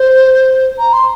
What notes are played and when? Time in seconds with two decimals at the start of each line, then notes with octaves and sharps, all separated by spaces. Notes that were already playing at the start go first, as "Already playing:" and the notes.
Already playing: C5
0.79 A#5
0.93 C6